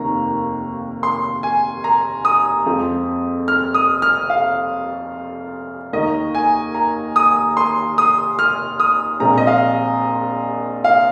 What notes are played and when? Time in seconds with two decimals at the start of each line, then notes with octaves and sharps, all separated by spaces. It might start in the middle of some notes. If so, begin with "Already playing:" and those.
Already playing: F1 D#2 D#3 A#3 A#5
1.03 C6
1.43 G#5
1.84 A#5
2.25 D#6
2.66 F2 F3 G#3 C4
3.48 F6
3.74 D#6
4.02 F6
4.30 F5
5.93 D#2 D#3 A#3 D#5
6.35 G#5
6.75 A#5
7.16 D#6
7.57 C6
7.98 D#6
8.39 F6
8.80 D#6
9.20 A#1 A#2 G#3 C4 A#5
9.38 D#5
9.47 F5
10.84 F5